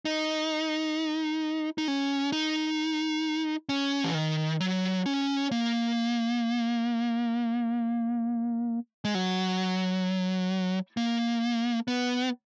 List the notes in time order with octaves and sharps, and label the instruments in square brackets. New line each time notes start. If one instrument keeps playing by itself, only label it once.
[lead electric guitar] D#4
D#4
C#4
D#4
C#4
E3
D#3
F#3
C#4
A#3
G#3
F#3
A#3
B3